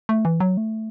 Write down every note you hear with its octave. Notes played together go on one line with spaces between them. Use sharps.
A3
E3
F#3
A3